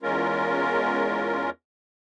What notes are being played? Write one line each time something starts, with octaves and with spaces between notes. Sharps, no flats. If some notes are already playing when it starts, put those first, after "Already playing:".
E2 G#3 C#4 F4 A#4